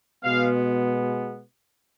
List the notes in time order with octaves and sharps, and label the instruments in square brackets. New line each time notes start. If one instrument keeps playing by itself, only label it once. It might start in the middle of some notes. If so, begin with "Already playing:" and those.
[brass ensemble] B2 G#3 B3 F5